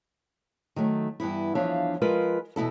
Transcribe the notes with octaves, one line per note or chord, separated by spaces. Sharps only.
D#3 F#3 A3
G2 E3 B3 E4
E2 F3 D4 C#5 E5 F5
F3 G#3 F4 A#4 B4
E2 B2 F3 E4 A4